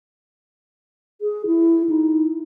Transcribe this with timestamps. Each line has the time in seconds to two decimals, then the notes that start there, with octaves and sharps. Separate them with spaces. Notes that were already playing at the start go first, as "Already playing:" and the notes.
1.21 G#4
1.46 E4
1.89 D#4